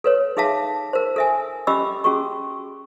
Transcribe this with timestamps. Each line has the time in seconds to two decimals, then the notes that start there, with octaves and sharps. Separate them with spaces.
0.04 A4 B4 C#5
0.37 D#4 G#4 E5 F5 A5
0.93 A#4 C5
1.16 A4 E5 G#5
1.67 C#4 G4 D#5 B5 D6 E6
2.04 C#4 F#4 G#4 C#6